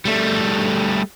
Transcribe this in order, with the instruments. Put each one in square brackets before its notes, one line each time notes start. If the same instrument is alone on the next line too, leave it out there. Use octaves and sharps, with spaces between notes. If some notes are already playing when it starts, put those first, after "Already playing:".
[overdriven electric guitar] G3 A3